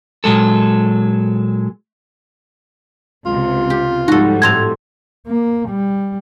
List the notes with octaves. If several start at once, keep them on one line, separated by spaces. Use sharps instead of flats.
A#2 F#3 G#3 A4
C#2 C3 F4
G4
G#2 F3 G3 D#4 F#4 A4
A2 C4 A5 G#6 F7
A#3
G3